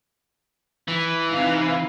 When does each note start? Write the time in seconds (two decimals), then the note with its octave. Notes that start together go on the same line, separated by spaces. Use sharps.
0.88 E3
1.30 C3 D#4 F5